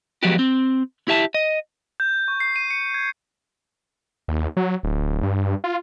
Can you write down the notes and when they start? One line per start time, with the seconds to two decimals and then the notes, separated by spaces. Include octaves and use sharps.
0.23 F3 F#3 G#3 B3 F#4 G4
0.39 C4
1.08 E4 G4 E5 A5
1.34 D#5
2.00 G6
2.28 C#6
2.40 C7
2.56 D#7
2.71 C#7
2.94 G#6
4.28 D#2
4.57 F#3
4.83 D1
5.23 G2
5.64 F4